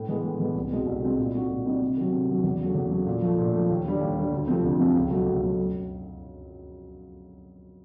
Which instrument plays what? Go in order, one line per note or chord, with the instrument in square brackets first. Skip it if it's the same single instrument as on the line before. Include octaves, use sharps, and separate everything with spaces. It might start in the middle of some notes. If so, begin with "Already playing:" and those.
Already playing: [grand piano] A2
E3 G#3 B3
A2
E3 G#3 B3
C2
B2 G#3 C4
C2
B2 G#3 C4
A#2
G3 C4 D#4 F#4
A#2
G3 C4 D#4 F#4
C3
D#3 F#3
C3
D#3 F#3
E2
C#3 F#3 A3
E2
C#3 F#3 A3
A#2
F3 A3
A#2
F3 A3
D#2
D3 G3
D#2
D3 G3
D2
C3 F3 A3 C4
D2
C3 F3 A3 C4
C#2
B2 F#3 A3
C#2
B2 F#3 A3
F#2